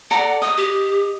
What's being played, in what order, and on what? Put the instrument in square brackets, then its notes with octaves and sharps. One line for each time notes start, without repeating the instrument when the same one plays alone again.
[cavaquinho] A4 D5 A#5 [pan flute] F#5
[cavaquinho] D#5 [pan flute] D#6
[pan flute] G4